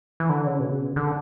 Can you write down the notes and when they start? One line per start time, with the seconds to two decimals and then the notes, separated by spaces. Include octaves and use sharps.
0.20 E3
0.29 D3
0.47 C#3
0.60 B2
0.71 C#3
0.96 D3